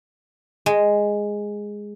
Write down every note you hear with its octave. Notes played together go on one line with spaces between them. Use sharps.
G#3